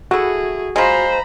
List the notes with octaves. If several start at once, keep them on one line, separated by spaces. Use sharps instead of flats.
A3 E4 F#4 G#4
G#3 F4 C5 A#5 B5